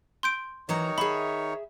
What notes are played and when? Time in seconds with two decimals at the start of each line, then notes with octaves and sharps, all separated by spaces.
0.23 C6 G6 D7
0.69 D#3 E3 D#4 F#4 C#5 A#5
0.98 G#4 E5 B5